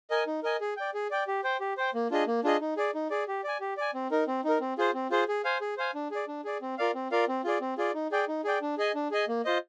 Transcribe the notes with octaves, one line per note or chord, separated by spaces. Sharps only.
A#4 D#5 G#5
D#4
A#4 D#5 G#5
G#4
D5 G5
G#4
D5 G5
G4
C5 G5
G4
C5 G5
A#3
D4 F4 G#4 D#5
A#3
D4 F4 G#4 D#5
D#4
G#4 D5
D#4
G#4 D5
G4
D5 G#5
G4
D5 G#5
C4
D#4 A#4
C4
D#4 A#4
C4
F4 G#4 C5
C4
F4 G#4 C5
G#4
C5 F5 G#5
G#4
C5 F5 G#5
D4
G#4 D5
D4
G#4 D5
C4
F4 A#4 D5 F5
C4
F4 A#4 D5 F5
C4
F4 G#4 D5
C4
F4 G#4 D5
D#4
G#4 D5 G5
D#4
G#4 D5 G5
D4
G#4 D#5 G#5
D4
G#4 D#5 G#5
A#3
F4 C5 D#5